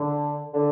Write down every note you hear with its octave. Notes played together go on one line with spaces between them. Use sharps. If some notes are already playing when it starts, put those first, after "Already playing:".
Already playing: D3
D3